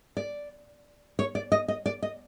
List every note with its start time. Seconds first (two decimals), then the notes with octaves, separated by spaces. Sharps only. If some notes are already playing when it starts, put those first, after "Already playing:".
0.17 D5
1.19 C#5
1.35 D5
1.52 D#5
1.68 D#5
1.86 D5
2.02 D#5